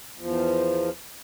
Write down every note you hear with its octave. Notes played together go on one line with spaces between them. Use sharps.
E2 F3